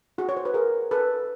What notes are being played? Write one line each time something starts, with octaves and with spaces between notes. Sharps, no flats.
F#4 G#4
C#5
C5
B4
G#4 A#4
A4 B4